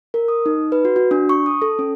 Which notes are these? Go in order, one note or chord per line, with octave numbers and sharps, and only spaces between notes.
A#4
D#6
D#4
B4
F#4
F#4
D4
C#6
D#6
A4
C#4